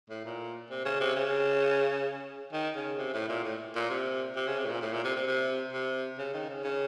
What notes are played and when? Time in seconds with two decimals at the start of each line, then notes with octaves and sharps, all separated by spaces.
0.10 A2
0.25 A#2
0.70 C3
0.85 C#3
1.00 C3
1.16 C#3
2.53 D#3
2.76 C#3
2.98 C3
3.14 A2
3.29 A#2
3.44 A2
3.75 A#2
3.90 C3
4.36 C3
4.47 C#3
4.58 C3
4.66 A2
4.70 A#2
4.81 A2
4.93 A#2
5.04 C3
5.16 C3
5.27 C3
5.73 C3
6.18 C#3
6.34 D#3
6.49 C#3
6.64 C#3